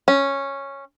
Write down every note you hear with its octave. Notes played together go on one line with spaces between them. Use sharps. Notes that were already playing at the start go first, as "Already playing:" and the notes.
C#4